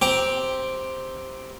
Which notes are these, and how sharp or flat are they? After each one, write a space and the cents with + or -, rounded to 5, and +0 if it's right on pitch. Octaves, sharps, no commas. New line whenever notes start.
C4 +0 G4 +0 A#5 +25